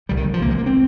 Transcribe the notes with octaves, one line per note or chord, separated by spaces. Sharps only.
C2 A#2 G3
D#3
F3
C2 C3 A#3
G#3
A#3
C4